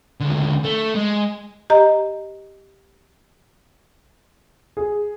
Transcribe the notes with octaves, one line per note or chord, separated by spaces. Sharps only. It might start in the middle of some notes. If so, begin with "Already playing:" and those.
C#2 D3
A3
G#3
G4 D#5 A#5
G#4